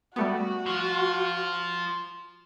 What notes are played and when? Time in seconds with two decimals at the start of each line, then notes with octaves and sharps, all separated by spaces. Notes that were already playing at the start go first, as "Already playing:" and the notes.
0.16 G3 A3 B3 F#4
0.66 F3 F4